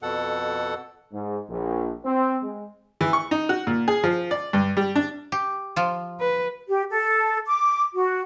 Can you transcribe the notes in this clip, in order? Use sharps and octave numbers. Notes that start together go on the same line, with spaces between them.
F2 B2 A4 F#5
G#2
A#1
C4
G#3
E3
C#6
D#4
F#4
A#2
G#4
F3
D5
G2
G3
D4
G4
F3 F4
B4
G4
A4
D6
F#4